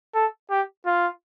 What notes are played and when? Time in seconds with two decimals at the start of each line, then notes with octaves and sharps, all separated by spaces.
0.15 A4
0.50 G4
0.86 F4